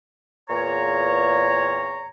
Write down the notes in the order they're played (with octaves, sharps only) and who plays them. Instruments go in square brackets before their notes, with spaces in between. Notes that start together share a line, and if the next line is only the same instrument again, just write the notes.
[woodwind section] E2 A#2 C#5 A#5